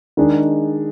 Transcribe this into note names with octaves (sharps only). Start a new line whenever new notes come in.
D#3 G#3 D4 G#4